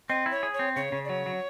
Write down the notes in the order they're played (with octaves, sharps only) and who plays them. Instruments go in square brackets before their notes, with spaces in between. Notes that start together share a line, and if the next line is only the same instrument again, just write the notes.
[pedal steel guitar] C4 [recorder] D#5
[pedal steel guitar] E4
[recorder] C#5
[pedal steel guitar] G#4
[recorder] C#5
[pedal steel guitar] C4
[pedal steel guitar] C#3 [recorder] C#5
[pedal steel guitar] C#3
[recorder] D5
[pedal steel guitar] F#3 [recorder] C#5
[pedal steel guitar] F#3